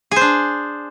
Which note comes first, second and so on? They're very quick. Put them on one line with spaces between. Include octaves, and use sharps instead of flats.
G#4 C5 D4